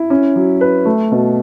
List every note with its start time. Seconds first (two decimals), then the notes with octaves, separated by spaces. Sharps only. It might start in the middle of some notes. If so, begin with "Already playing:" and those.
Already playing: E4
0.10 C#4
0.36 F#3
0.61 B4
0.85 A3
1.12 B2